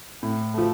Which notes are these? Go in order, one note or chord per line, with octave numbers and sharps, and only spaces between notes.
A2
F3 A3